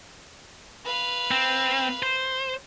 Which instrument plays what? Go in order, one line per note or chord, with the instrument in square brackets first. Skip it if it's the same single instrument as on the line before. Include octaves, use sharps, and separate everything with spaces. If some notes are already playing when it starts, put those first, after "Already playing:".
[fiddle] B4 F5
[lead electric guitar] C4
C5